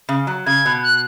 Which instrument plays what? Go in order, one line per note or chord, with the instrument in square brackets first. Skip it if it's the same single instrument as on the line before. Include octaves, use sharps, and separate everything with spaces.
[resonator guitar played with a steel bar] C#3
F#3
[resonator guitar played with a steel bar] C#3 [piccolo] G#6
[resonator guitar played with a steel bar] B2
[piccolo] F#6